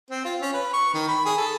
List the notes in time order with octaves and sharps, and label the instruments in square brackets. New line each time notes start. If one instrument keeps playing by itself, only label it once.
[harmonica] C4
F4
C#4
B4
C#6
D#3
B5
G#4
A4